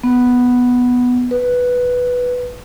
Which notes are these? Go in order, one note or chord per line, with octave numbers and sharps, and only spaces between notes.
B3
B4